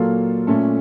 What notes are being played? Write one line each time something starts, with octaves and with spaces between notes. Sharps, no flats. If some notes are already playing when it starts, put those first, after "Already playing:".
Already playing: A#2 F#3 A#3 F4 A4
A#2 A3 C#4 A4